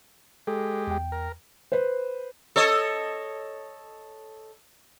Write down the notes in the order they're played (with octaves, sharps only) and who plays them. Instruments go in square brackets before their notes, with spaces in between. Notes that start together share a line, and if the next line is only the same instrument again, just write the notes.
[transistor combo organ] G#3 G4 [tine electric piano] A4
[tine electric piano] E2 G5
[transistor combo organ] A#4
[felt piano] B4 C5
[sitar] A4 C#5 D#5